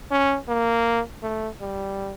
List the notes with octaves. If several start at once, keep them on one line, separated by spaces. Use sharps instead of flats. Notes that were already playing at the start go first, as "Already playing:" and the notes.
C#4
A#3
A3
G3